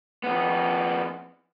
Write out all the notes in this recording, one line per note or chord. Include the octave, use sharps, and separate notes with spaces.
F2 B3